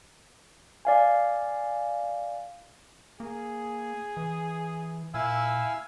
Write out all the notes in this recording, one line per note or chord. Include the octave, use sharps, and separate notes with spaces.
D5 F5 G#5
A#3 G#4
E3
A#2 E4 F5 G#5 E6